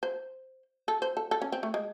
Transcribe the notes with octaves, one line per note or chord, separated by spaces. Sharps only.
C5
A4
C5
A4
A4
C#4
C4
A3
G#3